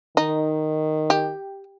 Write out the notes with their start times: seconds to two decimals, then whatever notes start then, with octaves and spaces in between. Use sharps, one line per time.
0.17 D#3 D#4
1.10 G4